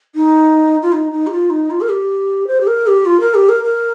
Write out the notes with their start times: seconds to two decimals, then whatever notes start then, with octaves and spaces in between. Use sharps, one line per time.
0.15 D#4
0.83 F4
0.92 D#4
1.12 D#4
1.27 G4
1.32 F4
1.50 D#4
1.70 F4
1.81 A#4
1.89 G4
2.47 C5
2.61 G4
2.67 A#4
2.87 G4
3.06 F4
3.20 A#4
3.35 G4
3.49 A#4
3.64 A#4